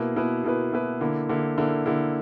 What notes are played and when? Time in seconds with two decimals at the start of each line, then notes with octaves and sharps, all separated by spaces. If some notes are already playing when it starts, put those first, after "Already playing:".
Already playing: B2 A#3 E4 B4
0.16 B2 A#3 E4 B4
0.44 B2 A#3 E4 B4
0.72 B2 A#3 E4 B4
1.01 D3 A#3 E4
1.29 D3 A#3 E4
1.58 D3 A#3 E4
1.86 D3 A#3 E4